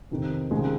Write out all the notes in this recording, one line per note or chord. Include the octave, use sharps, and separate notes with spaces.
F2 C3 D#3
C#2 C3 D#3 G#3 G#4